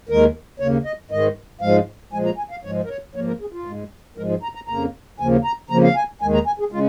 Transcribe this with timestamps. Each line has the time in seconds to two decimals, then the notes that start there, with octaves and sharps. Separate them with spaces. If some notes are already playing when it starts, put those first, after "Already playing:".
0.09 D#2 D#3 G#3 A#4
0.59 D#2 C#3 A#3 C#5
0.85 D#5
1.10 G#2 D#3 G#3 D#5
1.61 G#2 F3 G#3 F5
2.13 A#2 F3 G#3 G#5
2.25 A#5
2.38 G#5
2.51 F5
2.63 G#2 F3 G#3 C#5
2.84 A#4
2.90 C#5
3.15 G#2 F3 A#3 C#5
3.27 A#4
3.41 G#4
3.53 F4
3.65 G#2 G#3
4.17 G#2 F3 G#3 A#4
4.30 G#4
4.43 A#5
4.55 A#5
4.68 F2 C#3 A#3 A#5
5.19 D#2 C#3 F3 A#3 G#5
5.44 A#5
5.70 F2 C#3 F3 A#3 A#5
5.84 F5
5.96 G#5
6.21 D#2 D#3 G#3 G#5
6.34 A#5
6.47 G#5
6.60 G#4
6.72 C#3 G#3 F4